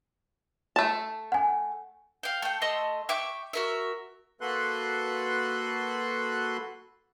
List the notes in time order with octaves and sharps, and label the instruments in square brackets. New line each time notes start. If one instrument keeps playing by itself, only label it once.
[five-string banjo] A3 A5
[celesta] F#5 G#5
[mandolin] F5 G5
A3 G5
A3 D#5 C6 E6
E5 G5 C#6 D6
F#4 A#4 E5
[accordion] A#3 F#4 A4 B4 C6 F#6